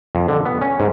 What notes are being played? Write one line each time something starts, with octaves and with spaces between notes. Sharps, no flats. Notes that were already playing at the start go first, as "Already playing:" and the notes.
F2
D3
B3
C#4
G#2